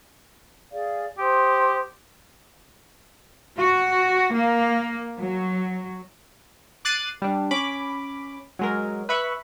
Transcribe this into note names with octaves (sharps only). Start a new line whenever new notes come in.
G#4 D5 F5
G4 C5 C6 D#6
F#4
A#3
F#3
D6 F#6 A6 C7 D#7
G3 D4
C#4 B5 D6
F#3 G#3 A#4
B4 E5 B5 C#6